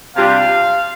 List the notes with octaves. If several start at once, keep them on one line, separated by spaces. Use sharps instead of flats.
C3 G3 D4 F4 F5